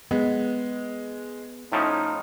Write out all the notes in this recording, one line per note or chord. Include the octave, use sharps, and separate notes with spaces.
G#3 B3
A2 F3 C#4 D#4